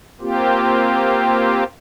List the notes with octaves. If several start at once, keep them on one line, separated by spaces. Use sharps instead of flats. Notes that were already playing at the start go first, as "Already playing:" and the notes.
A#3 C4 F4 G4